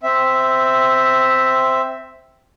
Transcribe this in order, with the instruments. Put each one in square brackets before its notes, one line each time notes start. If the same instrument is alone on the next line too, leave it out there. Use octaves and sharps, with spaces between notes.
[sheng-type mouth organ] C4 E5